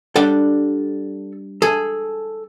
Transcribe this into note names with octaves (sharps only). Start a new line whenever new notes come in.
G3 D4 A4 F#5
G#4 A4